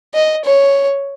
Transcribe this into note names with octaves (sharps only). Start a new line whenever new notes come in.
D#5
C#5